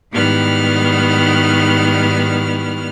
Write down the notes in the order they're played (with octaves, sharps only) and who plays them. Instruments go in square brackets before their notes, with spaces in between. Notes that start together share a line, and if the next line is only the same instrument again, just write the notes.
[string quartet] G#2 D#3 G3 B3 E4 F6